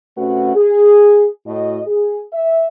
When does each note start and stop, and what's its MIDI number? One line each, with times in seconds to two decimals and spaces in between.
0.17 0.52 48
0.17 0.52 57
0.17 0.52 61
0.17 0.52 66
0.17 0.52 71
0.17 0.52 78
0.55 1.26 68
1.46 1.80 45
1.46 1.80 66
1.46 1.80 75
1.86 2.21 68
2.33 2.65 76